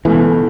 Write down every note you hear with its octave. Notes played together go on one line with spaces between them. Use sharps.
C#2 B2 E3 A3